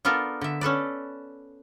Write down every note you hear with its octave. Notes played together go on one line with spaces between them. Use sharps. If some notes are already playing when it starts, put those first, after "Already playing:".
B3 D4 F4 A4 A#4
D3 E5
C#4 A4 B4 D5